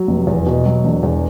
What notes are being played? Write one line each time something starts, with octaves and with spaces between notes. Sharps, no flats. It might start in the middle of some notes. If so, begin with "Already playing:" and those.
Already playing: F#3
F1
E2
B2
F#3
E1
E2